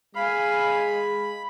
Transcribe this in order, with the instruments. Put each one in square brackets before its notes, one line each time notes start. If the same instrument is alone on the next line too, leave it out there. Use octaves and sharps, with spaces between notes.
[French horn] G#3 [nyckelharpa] F5 G#5 [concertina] B5